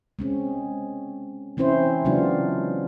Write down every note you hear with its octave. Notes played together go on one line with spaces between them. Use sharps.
G#3 C4 C#4
E3 C4 C#4 E4 C5
C#3 F#3 G#3 B3 D4 F4